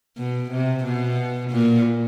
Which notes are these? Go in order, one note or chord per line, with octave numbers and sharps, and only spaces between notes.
B2
C3
B2
A#2